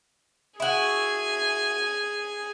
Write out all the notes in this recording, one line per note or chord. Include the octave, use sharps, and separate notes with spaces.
E4 F#4 G#4 G#5